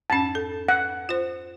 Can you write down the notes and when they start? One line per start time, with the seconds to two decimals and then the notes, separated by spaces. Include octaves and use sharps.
0.10 F2 G#2 C#4 A5
0.35 A4
0.69 F#5
1.09 F4 C5